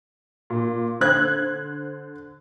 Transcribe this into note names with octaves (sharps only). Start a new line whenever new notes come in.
A#2
D3 C5 F#6 G#6